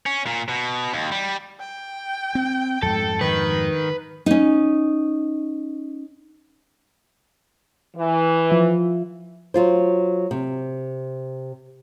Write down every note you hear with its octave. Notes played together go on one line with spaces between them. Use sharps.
C#4
A#2
B2
D#2
G3
G5
C4
F2 G#2 A4
D#3 B4
C#4 D#4
E3
F3 F4 E5
F#3 F4 C5
C3